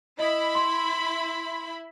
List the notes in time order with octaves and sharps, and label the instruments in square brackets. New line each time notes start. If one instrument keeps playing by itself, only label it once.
[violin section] E4 E5 B5 [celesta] D#5 D#6
[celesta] C6